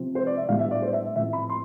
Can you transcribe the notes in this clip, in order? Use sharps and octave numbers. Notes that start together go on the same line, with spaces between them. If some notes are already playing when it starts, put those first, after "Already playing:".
Already playing: C3 F3 C4
C5
D5
E5
A2 G3 B3 D4 F5
E5
D5
C5
E5
E5
A2 F3 C4 E5
B5
C6